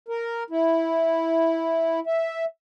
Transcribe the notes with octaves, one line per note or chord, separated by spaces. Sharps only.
A#4
E4
E5